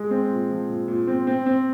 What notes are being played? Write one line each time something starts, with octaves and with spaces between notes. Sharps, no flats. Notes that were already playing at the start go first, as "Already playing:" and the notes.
Already playing: G#3
C4
A#2
F3
A#2
A#2
C4
C4
C4